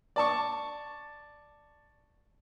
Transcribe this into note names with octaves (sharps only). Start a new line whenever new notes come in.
D5 A5 C#6